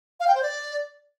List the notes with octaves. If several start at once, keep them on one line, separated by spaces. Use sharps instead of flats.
F5
G5
C5
D5